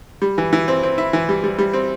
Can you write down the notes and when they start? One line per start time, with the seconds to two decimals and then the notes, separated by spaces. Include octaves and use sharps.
0.22 G3
0.38 E3
0.53 E3
0.68 C4
0.83 C4
0.98 E4
1.13 E3
1.29 G3
1.44 G3
1.58 G3
1.74 C4